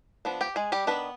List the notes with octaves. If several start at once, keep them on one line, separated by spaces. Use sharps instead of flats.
F3 B3 D4
G4 G5
G#3 G#4
G3 G4
D#3 G3 B3 D4 B4